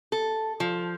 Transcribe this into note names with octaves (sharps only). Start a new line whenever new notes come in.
A4
F3